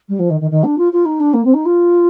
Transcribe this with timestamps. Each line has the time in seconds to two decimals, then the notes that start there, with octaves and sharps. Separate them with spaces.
0.09 G3
0.19 F3
0.30 D#3
0.41 D#3
0.51 D#3
0.64 D4
0.78 F4
0.93 F4
1.05 D#4
1.20 D4
1.34 A#3
1.45 C4
1.54 D#4
1.66 F4